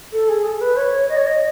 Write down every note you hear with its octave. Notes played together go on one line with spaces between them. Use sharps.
A4
G#4
A4
B4
C#5
D#5
C#5
D#5